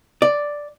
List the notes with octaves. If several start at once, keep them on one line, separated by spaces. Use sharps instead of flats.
D5